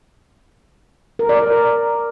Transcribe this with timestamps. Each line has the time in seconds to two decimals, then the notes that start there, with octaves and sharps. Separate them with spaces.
1.19 A#4
1.29 D5
1.39 A#4